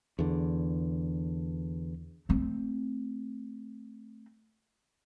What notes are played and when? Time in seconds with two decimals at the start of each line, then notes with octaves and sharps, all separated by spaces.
0.19 E2 D3
2.29 A3 C4